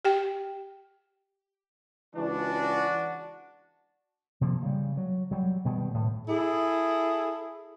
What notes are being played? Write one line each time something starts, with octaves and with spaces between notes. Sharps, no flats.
G4 G5
C#2 E3 D4 F#4
C3 F3 A#3
C#3 G3
F#3
F#3 G3
B2 D#3 G3
A2
E4 G#4 A4